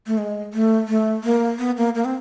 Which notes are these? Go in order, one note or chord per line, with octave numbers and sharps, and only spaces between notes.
A3
G#3
A3
A3
A#3
B3
A#3
A#3
C4